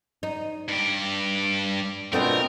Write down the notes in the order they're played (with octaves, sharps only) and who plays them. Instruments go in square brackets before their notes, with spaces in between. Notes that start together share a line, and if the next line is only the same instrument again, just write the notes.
[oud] D#4
[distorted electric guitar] G2 G4
[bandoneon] B2 B3 C4 [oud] A3 D4 F4 [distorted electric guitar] A#4